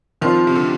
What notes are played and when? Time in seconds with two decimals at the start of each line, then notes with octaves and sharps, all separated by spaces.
0.21 D#3 F3 C4 F4 C5
0.47 C3
0.55 D3